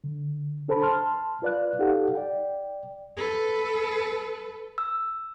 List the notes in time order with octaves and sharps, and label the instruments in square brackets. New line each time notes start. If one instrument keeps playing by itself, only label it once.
[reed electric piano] D3
D4 A4 C5 A5 B5
A5 C6 F6
F4 B4 D5 F5 F#6
D#4 G4 A4 F5 F#5
D5 G5
[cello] A4 B4
[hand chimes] E6